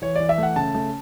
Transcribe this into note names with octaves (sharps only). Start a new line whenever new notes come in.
E3 C#5
E3 D5
E5
A3 F#5
C#3 A5
A3